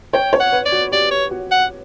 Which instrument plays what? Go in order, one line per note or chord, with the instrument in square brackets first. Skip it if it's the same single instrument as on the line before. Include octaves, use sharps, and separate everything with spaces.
[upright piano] C#5 [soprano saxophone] G5
[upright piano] C#5
[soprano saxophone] F#5
[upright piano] B4
[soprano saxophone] D5
[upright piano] F#4
[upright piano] G4 [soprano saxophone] D5
[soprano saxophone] C#5
[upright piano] F#4
[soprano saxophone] F#5